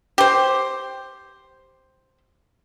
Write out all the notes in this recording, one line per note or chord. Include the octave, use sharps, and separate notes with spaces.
G4 C5